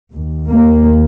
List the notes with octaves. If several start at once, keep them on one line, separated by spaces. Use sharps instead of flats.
D#2
A#3